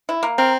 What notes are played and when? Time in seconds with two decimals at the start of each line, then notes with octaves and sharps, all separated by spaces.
0.09 E4
0.23 A#3
0.38 C4 A#4